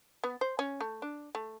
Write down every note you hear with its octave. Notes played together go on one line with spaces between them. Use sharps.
B3
C5
C#4
A3
D4
A3